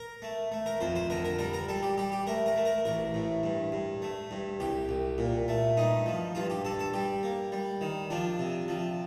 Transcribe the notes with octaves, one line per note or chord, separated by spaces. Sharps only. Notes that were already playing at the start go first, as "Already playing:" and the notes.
Already playing: A#4
A3
A3
A#4
F2 C5
C5
D3 A#4
A#4
G3 A#4
A#4
G3 A4
G4
G3 G4
G4
A3 A#4
A#4
A3
A#4
A1 A#4
A2
G2
G2
A3
G2
C2 G4
C2
A#2
A3
G2 D#4
F3
G2 F4
G4
G2 A4
A4
G3 G4
A#3
G3
D#3
F3 D4
C3
F3